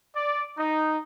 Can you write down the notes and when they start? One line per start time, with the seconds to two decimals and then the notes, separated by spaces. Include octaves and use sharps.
0.16 D5
0.58 D#4